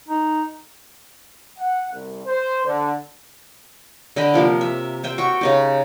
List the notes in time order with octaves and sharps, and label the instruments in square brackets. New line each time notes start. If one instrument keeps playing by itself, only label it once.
[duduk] D#4
[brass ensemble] F#5
C2
C5
D3
[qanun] D3 D#5 G5 B5
C3 F3 A#3
E5
C5 E5 G5
F#4 G5 C#6
C#3 D#4 G4